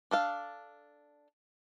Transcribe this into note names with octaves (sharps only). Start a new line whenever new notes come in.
D4 A4 F5